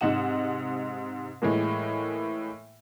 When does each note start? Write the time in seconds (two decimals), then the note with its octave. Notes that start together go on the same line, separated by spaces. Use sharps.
0.01 G#2 C3 D#4 F#5 E7
1.42 A2 E3 G#3 A#3